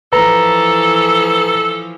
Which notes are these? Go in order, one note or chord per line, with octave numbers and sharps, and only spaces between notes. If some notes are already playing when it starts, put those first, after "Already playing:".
E3 F3 A4 B4 A#5